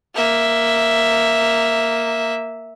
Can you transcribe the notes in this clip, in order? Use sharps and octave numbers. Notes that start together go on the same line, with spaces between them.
A#3 E5